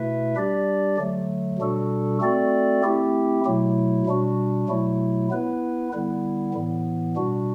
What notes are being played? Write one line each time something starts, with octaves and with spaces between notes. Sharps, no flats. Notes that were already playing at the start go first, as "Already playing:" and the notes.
Already playing: B2 A3 E4 B4 E5
G3 D4 G4 D5
D3 F#3 A3
B2 G3 D4 F#4 A4
A3 C4 F#4 A4 D5
A3 C4 E4 G4
B2 F#3 A3 E4
B2 G3 D4 F#4
B2 F#3 A3 E4
B3 E4 B4
D3 G3 B3 E4
A2 E3 B3
B2 G3 D4 F#4